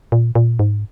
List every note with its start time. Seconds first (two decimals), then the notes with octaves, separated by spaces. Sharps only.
0.12 A#2
0.35 A#2
0.59 G#2